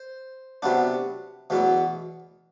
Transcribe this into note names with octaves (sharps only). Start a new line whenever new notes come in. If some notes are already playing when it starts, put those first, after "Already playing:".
Already playing: C5
C3 F#3 B3 D4
E2 B2 F#3 B3